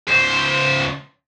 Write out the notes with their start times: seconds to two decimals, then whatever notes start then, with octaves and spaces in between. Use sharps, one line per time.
0.08 C#2 C5